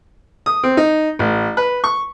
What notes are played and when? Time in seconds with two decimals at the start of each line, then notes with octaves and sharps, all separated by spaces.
0.46 D#6
0.63 C4
0.77 D#4
1.19 A1
1.57 B4
1.84 C#6